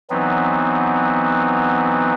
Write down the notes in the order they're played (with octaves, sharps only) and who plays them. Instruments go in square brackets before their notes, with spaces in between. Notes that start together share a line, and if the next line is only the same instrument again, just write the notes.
[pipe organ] E3 F#3 B3 C4 D#4